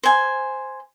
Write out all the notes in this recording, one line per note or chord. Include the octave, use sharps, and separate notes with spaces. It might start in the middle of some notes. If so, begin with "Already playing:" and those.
C5 G#5